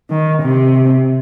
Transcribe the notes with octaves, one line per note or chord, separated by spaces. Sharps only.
D#3
C3